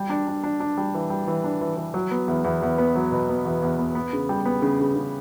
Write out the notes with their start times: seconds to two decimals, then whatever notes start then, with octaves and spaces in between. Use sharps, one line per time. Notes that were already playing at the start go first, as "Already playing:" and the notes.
Already playing: G3
0.10 D4
0.27 D4
0.44 D4
0.60 D4
0.77 G3
0.95 E3
1.10 G3
1.28 E3
1.44 D4
1.61 E3
1.77 E3
1.94 F#3
2.11 B3
2.27 E2
2.44 E2
2.62 E2
2.78 B3
2.95 F#3
3.12 B2
3.29 B3
3.45 E2
3.62 E2
3.79 B3
3.95 B3
4.13 C#3
4.29 G3
4.45 B3
4.62 C#3
4.80 C#3
4.96 C#3